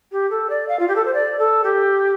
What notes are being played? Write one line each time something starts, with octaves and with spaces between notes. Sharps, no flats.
G4
A4
D5
F5
F4
G4
A4
C5
D5
A4
G4